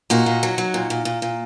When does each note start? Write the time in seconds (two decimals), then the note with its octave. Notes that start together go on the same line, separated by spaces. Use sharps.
0.10 A#2 D#4 F#4
0.26 A#2
0.43 F#3
0.58 F#3
0.74 A#2
0.90 A#2
1.05 A#2
1.22 A#2